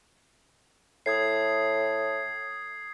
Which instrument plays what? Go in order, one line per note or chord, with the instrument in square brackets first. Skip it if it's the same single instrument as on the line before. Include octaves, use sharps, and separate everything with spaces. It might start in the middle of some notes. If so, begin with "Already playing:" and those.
[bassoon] A2 [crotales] D#6 G#6 C7